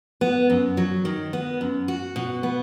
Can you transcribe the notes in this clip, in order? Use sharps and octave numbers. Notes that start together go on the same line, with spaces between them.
B3
F#2
F#3
D#3
B3
F#2
F#4
B2
B3